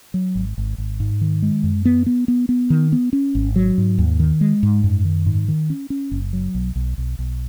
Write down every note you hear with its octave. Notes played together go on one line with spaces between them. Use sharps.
F#3
G#1
G#1
G#1
G#2
D#3
G#3
F#2
B3
B3
B3
B3
D#3
B3
C#4
G#1
F#3
G#2
D#2
D#3
G#3
G#2
F#2
D#3
G#2
D#3
C#4
C#4
F#1
F#3
B1
B1
B1
B1